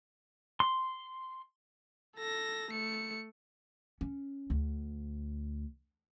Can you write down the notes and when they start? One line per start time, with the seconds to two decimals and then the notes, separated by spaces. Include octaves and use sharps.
0.60 C6
2.16 A4 A#6
2.71 A3 C#7
4.01 C#4
4.50 D2